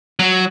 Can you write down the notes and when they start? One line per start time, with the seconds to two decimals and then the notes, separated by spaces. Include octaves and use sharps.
0.19 F#3